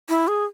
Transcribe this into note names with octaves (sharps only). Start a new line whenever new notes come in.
E4
G#4